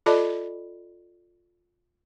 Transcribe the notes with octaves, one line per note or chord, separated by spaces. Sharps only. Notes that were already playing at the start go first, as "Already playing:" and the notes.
F4 A4 D5 D#5 A5 B5